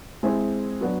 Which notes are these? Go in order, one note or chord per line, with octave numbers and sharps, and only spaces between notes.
G#3 C4 E4 G#4
F#3 B3 D4 F#4